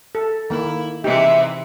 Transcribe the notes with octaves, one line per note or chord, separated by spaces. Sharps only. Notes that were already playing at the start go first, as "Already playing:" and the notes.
A4
D#3 A#3 E4
C3 E3 G#3 D#4 G4 E5